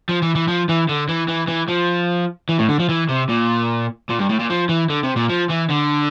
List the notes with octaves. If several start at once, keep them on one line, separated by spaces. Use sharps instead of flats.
F3
E3
E3
F3
E3
D3
E3
E3
E3
F3
E3
A2
D3
F3
E3
C3
A#2
A#2
G2
A2
A#2
F3
E3
D3
C3
A#2
F3
E3
D3